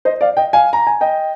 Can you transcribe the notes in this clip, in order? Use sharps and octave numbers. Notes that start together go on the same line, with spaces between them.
C5 D#5
D5 F5
D#5 G5
F5 G#5
A#5
G#5
D#5 G5